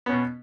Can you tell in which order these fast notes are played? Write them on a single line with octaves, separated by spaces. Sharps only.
B3 C#4 B2